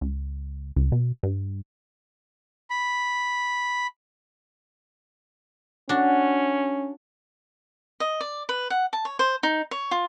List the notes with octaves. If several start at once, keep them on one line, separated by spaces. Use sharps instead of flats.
C#2
C#2
B2
G2
B5
C#4 D4 F#4
D#5
D5
B4
F#5
A5
C#5
C5
D#4
C#5
F4